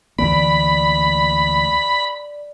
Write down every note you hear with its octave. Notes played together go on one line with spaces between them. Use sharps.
D2 E3 A#3 D5 B5